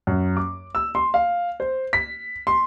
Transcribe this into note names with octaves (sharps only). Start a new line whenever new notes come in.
F#2
D6
E6
C6
F5
C5
B6
C6